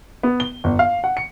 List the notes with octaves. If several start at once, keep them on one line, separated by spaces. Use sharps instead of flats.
B3
G7
G1
F5
F#5
C#7